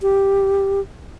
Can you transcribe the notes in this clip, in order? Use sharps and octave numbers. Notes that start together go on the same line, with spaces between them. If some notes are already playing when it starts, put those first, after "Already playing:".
G4